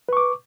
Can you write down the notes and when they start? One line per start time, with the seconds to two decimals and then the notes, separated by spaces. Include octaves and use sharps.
0.09 B4
0.13 C#6
0.17 D6